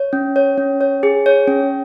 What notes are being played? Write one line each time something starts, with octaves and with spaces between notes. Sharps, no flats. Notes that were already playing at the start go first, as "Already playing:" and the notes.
Already playing: C#5
C#4
C#5
C#4
C#5
G#4
C#5
C#4